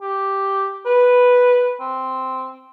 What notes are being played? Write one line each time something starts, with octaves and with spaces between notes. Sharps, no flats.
G4
B4
C4